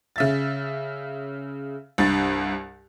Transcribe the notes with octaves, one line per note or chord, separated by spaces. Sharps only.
C#3 E5 A6
C2 G2 A6